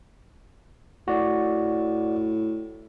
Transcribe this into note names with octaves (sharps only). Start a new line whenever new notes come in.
A2 F#4 D5